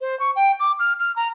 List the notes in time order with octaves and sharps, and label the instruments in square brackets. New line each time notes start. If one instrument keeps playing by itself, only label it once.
[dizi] C5
C#6
G5
D6
F6
F6
A#5